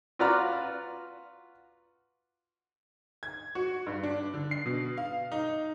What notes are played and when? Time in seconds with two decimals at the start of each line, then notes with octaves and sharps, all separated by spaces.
0.19 F4 F#4 B4 D5 A#5 F6
3.23 G#6
3.55 F#4
3.87 G2
4.03 D4
4.34 D3
4.51 C7
4.66 B2
4.97 F5
5.32 D#4